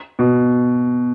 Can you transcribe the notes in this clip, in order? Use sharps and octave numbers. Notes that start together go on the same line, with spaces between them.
B2